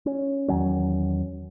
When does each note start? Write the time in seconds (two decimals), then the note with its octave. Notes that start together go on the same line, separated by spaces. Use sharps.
0.06 C#4
0.48 E2 D#3 F#3 C#4